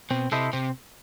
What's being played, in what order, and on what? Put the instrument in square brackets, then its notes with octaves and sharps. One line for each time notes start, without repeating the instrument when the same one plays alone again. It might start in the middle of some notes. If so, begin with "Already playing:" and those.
[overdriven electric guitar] B2 [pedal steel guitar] C4
[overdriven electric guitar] C3 [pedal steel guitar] E4 A4 C5 D#5
[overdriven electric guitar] C3 [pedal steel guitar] C4